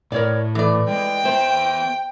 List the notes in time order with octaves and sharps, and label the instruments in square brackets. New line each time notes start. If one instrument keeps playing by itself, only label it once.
[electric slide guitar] A2 [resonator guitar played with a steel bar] A#4 C#5 D5
[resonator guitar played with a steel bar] E3 D5 [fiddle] A3
[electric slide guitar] G#3 [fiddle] G5
[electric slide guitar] B3 E5 [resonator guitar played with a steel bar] C5